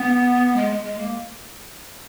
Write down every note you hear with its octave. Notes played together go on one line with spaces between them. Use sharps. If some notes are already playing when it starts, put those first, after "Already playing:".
Already playing: B3
G#3
G#3
G#3
A#3